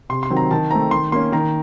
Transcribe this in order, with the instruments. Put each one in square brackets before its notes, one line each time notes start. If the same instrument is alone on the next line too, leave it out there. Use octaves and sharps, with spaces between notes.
[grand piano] C3 C6
C6
D#3 F#3 C4
A#5
D#3 A5
A3 C4 A#5
D#3 C6
A#3 C#4 C6
D#3 A#5